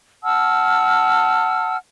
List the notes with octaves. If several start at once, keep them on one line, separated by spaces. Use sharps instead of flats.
F#5 A5 E6 F6